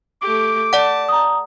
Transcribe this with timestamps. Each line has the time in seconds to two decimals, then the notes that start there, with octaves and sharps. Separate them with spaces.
0.22 A3 G4 D6
0.73 D5 F#5 A5
1.09 A#5 D#6